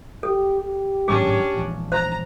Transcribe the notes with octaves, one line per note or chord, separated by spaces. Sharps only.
G4 A4
G4
G#1 F#2 A2 C#4 D4 G#4
E1 A#1
C5 A#5